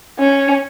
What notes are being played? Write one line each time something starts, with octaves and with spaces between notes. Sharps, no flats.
C#4